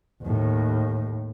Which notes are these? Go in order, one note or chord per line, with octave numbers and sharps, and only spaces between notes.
D#2 A2